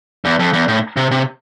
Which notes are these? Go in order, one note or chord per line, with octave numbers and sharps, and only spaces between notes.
E2
F2
E2
A2
C3
C3